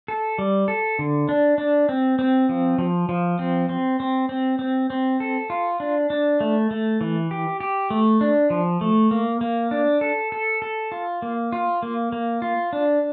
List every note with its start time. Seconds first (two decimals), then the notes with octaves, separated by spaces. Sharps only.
0.08 A4
0.39 G3
0.68 A4
0.99 D3
1.29 D4
1.58 D4
1.89 C4
2.19 C4
2.49 F3
2.78 F3
3.09 F3
3.39 C4
3.69 C4
4.00 C4
4.29 C4
4.59 C4
4.90 C4
5.20 A4
5.50 F4
5.80 D4
6.10 D4
6.41 A3
6.71 A3
7.01 E3
7.31 G4
7.60 G4
7.90 A3
8.21 D4
8.50 F3
8.81 A3
9.11 A#3
9.41 A#3
9.71 D4
10.01 A4
10.32 A4
10.62 A4
10.92 F4
11.22 A#3
11.53 F4
11.83 A#3
12.12 A#3
12.42 F4
12.73 D4